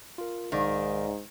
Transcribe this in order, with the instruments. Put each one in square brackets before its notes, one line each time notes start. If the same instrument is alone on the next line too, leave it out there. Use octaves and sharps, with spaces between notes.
[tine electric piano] F4 A#4
[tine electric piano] B1 D5 F5 [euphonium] G#2 [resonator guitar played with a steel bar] D#3